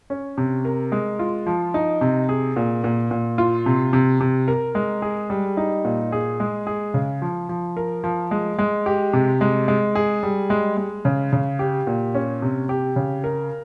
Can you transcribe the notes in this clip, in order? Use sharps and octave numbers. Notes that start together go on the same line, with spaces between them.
C#4
C3
A#4
G#3
F4
F3
D#4
C3
G#4
A#2
A#2
A#2
F4
C3
C3
C3
A#4
G#3
G#4
G3
D#4
A#2
G#4
G#3
G#4
C#3
F3
F3
A#4
F3
G#3
G#3
G4
C3
G#3
G#3
G#4
G3
G#3
G#3
C#3
C#3
G4
A#2
C#4
C3
G4
C#3
A#4